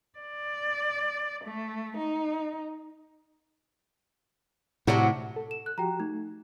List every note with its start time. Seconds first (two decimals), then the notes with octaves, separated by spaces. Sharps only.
0.19 D5
1.45 A3
1.98 D#4
4.87 A2 C3 F#3 G3 F#4
5.36 A4
5.51 E7
5.66 F#6
5.78 F3 F#4 G4 G5 A#5
6.00 A3 D#4